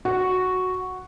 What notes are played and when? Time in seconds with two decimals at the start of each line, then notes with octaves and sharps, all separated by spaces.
0.05 F#4